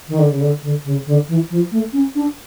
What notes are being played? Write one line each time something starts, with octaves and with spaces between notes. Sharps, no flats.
D#3
D3
C#3
D3
D3
C#3
D3
E3
F3
A3
C#4
D4